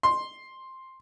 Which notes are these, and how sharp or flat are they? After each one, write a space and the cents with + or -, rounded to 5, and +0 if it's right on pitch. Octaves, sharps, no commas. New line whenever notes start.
C6 +5